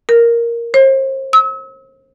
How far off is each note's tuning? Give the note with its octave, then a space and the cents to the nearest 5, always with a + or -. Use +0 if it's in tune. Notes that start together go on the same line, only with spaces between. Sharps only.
A#4 +5
C5 +40
E6 -40